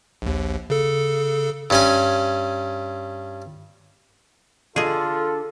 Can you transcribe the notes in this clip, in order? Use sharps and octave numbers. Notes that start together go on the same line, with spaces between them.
A#1 D#2
C#3 A4
G2 C#4 G#5
D3 F4 G#4 A4 D#5